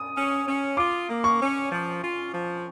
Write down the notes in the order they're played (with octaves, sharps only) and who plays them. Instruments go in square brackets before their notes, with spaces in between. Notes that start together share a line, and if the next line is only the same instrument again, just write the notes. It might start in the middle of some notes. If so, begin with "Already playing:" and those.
Already playing: [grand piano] D#6
[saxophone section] C#4
C#4
[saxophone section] F4 [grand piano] D6
[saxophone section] A#3
[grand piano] C#6
[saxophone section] C#4
F3
F4
F3